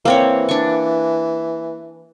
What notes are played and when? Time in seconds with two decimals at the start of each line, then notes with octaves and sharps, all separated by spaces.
0.05 E3 A#3 C4 C#5
0.49 D4 C#6